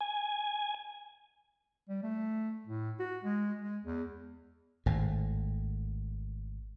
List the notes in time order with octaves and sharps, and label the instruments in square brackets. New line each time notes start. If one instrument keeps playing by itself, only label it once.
[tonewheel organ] G#5
[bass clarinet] G3
A3
A2
F#4
G#3
G#3
E2
[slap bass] G#1 A2